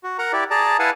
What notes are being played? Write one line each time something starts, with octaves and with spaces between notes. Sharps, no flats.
F#4
A#4 F#5 A#5
E4 G4 D5
G#4 D5 A5 A#5
E4 B4 F5 F#5 G#5 A5